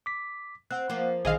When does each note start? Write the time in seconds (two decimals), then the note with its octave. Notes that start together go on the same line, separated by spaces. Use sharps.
0.06 D6 B6
0.71 C4 F#5 F#6
0.90 F3 A#3 C5
1.25 A#1 D3 D#3 G3 G#4 D#5 F5